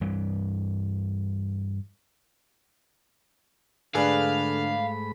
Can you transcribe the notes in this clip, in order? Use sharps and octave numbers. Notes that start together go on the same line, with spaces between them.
G2 E3 G3
G#2 D3 A3 D4 G#4 B4 F5 B5